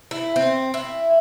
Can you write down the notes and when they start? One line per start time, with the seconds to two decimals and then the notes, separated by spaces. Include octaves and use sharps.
0.11 E4
0.36 C4
0.74 E4